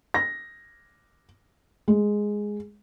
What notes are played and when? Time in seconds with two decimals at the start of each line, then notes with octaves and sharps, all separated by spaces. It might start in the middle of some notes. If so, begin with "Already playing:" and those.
0.14 A#6
1.88 G#3